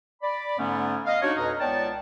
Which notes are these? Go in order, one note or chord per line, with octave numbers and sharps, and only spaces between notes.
D5 B5
G#2 D3 A3 B3 C#4
D#5 F5
D4 D#4 F#4 C#5
F2 B2 B4 D#5 A#5 F6
C#2 B3 C#5 D5 G5 A5